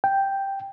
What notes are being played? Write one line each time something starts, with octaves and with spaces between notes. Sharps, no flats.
G5